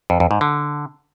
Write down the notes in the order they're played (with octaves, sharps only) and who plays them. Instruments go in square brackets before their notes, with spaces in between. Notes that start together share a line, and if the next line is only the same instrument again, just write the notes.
[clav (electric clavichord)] F2
F2
G#2
D3